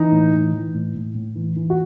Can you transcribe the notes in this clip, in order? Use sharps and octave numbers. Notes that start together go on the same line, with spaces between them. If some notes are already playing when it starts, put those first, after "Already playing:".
Already playing: E3 D#4
A2
E3
E3
A2
A2
A2
E3
E3
F#4